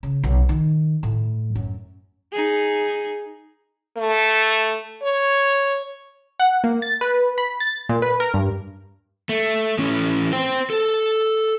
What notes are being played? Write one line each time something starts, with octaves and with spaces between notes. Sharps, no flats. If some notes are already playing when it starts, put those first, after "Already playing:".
C#3
B1
D#3
A2
F#2
D#4 G#4
A3
C#5
F#5
A#3
A6
B4
B5
A6
A#2
B4
A#4
G2
A3
A2 C#4
C5 G5
A4